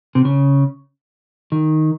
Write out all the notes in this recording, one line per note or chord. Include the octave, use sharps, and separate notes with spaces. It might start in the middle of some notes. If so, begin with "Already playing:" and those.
C3
C#3
D#3